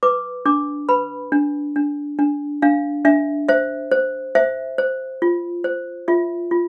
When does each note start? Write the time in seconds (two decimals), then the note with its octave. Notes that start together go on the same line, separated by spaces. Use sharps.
0.03 B4 D6
0.45 D4 D6
0.89 B4 B5
1.32 D4
1.76 D4
2.19 D4
2.62 D4 F5
3.05 D4 E5
3.48 C5 E5
3.91 C5
4.35 C5 E5
4.78 C5
5.22 F4
5.64 C5
6.08 F4 E5
6.51 F4